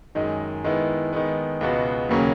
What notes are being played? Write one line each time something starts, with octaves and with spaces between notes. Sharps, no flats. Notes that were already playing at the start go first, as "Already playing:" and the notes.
F#2 D#3 G#3 D#4
D#3 G#3 B3 E4
D#3 G#3 B3
C#2 B2 G#3 B3 F#4
D#2 C#3 F#3 A#3 C#4